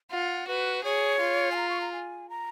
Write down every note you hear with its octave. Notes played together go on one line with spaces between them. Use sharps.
F4 F#5
F#4 B4
G#4 C#5
F4
G#5
A#5
C#6
A#5
G#5
A#5